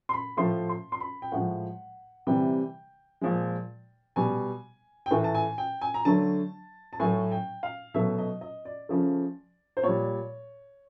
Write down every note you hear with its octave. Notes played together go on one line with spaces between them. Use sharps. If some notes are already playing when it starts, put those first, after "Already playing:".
C6
B5
A2 F3 A3 C6
C6
C6
B5
G5
A2 F3 G#3 F#5
C3 E3 G3 G5
A#2 F3 G#3
B2 G3 G#5
G5
A2 E3 A3 G#5
A5
G#5
G5
G#5
A#5
D3 F#3 A3 A5
A5
A2 F#3 A3 G#5
G5
F5
B2 F#3 A3 E5
D#5
D#5
D5
C#3 F3 A3
C5
A#2 G3 C#5